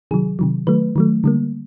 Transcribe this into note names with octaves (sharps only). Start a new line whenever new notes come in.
C3 D#3 F#3 G#4
C3 D#3 F#3
D#3 F#3 A3 B4
D#3 F#3 A3
D3 G3 A#3